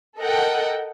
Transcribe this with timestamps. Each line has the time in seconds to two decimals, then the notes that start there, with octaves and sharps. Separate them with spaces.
0.18 A4 A#4 D#5 F#5 G5